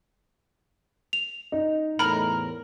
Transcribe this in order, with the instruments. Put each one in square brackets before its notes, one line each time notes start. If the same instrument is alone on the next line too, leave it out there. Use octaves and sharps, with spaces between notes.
[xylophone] F7
[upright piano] D#4
[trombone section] E2 A2 [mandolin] A#4 [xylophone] B5 F#7